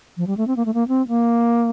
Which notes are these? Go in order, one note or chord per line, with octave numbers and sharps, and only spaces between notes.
F3
G3
A3
C4
A#3
A3
A#3
C4
A#3